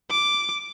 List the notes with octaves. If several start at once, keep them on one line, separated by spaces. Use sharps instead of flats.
D6